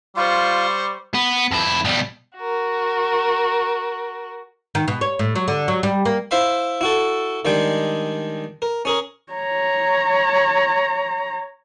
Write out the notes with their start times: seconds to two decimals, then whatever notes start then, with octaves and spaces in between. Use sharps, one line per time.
0.16 G3 F4 C5 C#6
1.14 B3
1.51 F2 E4
1.85 B2 G3
2.37 F#4 A#4
4.75 D#3
4.88 B2
5.01 C#5
5.19 A2
5.36 F#3
5.48 D3
5.68 F#3
5.83 G3
6.05 A#3
6.31 E4 C5 E5 F5 B5
6.81 E4 F#4 A4
7.45 D#3 G3 G#3 D4 G5
8.62 A#4
8.85 C#4 G#4 A#4
9.33 C#5 A#5